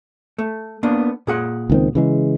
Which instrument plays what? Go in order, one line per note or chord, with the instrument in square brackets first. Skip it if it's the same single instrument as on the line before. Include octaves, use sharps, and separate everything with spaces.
[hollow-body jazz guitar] A3
A#3 B3 D4
A#2 G#4 F#5
[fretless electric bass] C#2 D#3 C4
C#3 E3 G#3